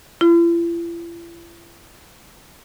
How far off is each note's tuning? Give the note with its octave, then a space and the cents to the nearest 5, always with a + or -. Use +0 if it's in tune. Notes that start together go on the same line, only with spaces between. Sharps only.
E4 +45